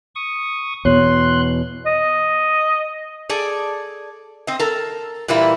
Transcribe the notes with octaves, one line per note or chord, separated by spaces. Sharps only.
C#6 D#6
E2 B2 C#5 C6 F#6
D#5
G#4 A4 D5
C4 D#5
A4 A#4
A#2 E3 G3 A#3 E4